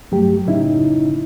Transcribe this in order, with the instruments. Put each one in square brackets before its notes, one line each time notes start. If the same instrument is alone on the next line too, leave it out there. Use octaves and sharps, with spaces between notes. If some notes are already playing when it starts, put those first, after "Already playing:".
[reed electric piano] G2 F#3 A3 G4
F#2 A2 C#3 C#4 D#4 E4